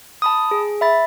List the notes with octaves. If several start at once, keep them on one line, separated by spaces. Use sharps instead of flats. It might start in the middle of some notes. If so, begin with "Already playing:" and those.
A5 B5 D#6
G#4
E5 B5 A6